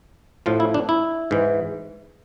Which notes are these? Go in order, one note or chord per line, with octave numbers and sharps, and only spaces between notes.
A2 F3 F4
E4
D4
E4
G#2 E3